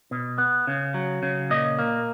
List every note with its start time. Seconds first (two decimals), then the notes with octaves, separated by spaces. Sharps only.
0.11 B2
0.38 B3
0.67 C#3
0.94 F#3
1.23 C#3
1.50 A#2 D#5
1.79 A#3